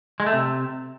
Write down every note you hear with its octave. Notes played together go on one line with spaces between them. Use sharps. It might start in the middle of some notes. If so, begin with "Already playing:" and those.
G#3
A3
C3